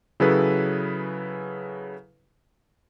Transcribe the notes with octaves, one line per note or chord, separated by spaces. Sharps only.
C#3 F#3 E4 G#4 A4 B4